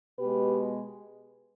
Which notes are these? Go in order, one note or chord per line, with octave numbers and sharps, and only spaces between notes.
B2 G#3 G4 B4